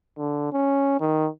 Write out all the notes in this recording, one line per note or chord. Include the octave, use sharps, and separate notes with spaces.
D3
C#4
D#3